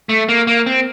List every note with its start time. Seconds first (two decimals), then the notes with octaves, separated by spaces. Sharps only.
0.09 A3
0.29 A#3
0.47 A#3
0.66 C4